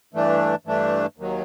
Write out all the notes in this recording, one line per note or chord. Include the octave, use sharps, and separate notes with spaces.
G2 E3 A3 D4
G2 E3 A3 D4
D#2 D#3 F#3